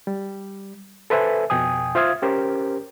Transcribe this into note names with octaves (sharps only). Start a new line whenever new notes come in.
G3
A4 B4 C5 E5 G#5
F2 B2 G5 G#5 D#6
F4 C5 E5 F5 D#6 G#6
C#4 G4 A#4 C5